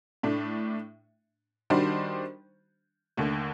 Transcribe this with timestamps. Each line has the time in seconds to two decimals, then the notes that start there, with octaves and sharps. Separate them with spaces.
0.23 A2 A3 D4
1.70 D#3 G3 D4 F#4 C5
3.17 D#2 D3 A3